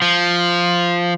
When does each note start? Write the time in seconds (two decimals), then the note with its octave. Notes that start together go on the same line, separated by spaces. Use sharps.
0.02 F3